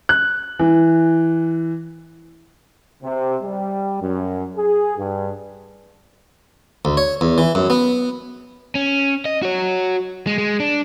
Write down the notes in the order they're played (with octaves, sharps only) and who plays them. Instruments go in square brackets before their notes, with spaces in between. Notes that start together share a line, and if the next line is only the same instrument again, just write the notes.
[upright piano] F#6
E3
[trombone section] C3
G3
F#2
G#4
G2
[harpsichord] D2
C#5
E2
E3
F#2
B3
[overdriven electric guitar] C#4
D#5
F#4 C#5
G#3
G#3
D4